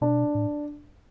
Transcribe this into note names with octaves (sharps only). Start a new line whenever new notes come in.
B2 D4
A2